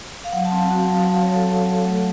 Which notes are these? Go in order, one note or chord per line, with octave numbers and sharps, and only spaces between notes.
F5
F#3 F#5
A5
C4
F#5
F#4 F#5
F#3 F5
F#5
F#3 F5
C#5
F#3
A4
F#3 A4
F#3
A3